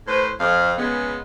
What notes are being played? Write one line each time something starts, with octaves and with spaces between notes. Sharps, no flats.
A2 B4 C5
F2 F5
C#3 G#3 B3